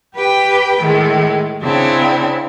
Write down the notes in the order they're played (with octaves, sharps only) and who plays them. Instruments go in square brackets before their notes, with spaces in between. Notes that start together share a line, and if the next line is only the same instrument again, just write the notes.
[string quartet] G4 B4 G5
A2 D#3 G#3
C#3 C4 D4 E4